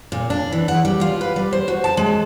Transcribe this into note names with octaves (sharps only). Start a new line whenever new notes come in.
A#2
D4
E3
F#5
G3
F4
B4
G3
C5
F#4
A5
G#3